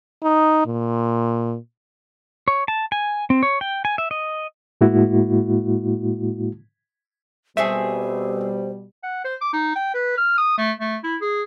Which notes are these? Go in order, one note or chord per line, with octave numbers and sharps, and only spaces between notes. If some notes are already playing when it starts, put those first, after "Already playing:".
D#4
A#2
C#5
A5
G#5
C4
C#5
G5
G#5
E5
D#5
A2 G#3 A#3 E4 F#4
B2 G3 A3 C4 G#4 C5 E5
F#5
C5
D6
D#4
G5
B4
F6
D#6
A3
A3
E4
G#4